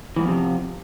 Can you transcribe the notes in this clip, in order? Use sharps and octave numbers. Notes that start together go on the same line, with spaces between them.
F2 G#2 C3 E3 F3